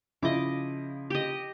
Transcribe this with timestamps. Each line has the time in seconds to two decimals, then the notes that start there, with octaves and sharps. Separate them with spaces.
0.23 C#3 F3 E4 D#5 D6
1.10 G4 D#5